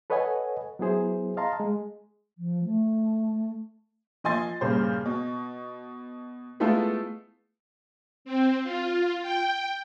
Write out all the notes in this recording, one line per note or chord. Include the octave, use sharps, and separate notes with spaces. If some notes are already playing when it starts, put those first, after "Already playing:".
A4 B4 C#5 D#5 F#5 G#5
F#3 B3 E4 G#4 C5
D#5 F5 A5 A#5 C6
G#3
F3
A3
F3 D#5 G#5 C6 A6
G2 A#2 C#3 C5
B2
G#3 A3 B3 E4 F4 A4
C4
F4
G5